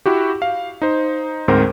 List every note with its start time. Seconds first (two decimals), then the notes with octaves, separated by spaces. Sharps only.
0.06 E4 F#4 G4
0.42 F5
0.82 D#4 C5
1.48 D2 G#2 C4 A#4 C5